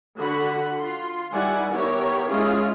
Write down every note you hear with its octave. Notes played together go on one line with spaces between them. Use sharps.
D3 F#4 F#5 B5
F4 C6
D#3 G3 E4 D5 F#5 G#5
B3 E4 G4 A#4 C#5
G#3 C#4 E4 F4 G#4